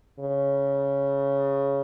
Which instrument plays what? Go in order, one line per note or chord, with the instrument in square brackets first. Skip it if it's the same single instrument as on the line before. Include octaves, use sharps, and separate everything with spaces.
[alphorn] C#3